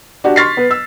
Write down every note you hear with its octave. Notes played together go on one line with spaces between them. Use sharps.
D4 F#4 G4
C6 C#6 F6 A6 B6 C7
B3 B4
E6